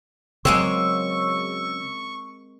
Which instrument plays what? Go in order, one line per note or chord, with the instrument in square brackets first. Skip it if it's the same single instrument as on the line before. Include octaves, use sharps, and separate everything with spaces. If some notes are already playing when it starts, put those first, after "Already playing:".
[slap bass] C#3 F#3 [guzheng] G#3 A#3 C4 [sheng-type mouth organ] C#6 [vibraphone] E6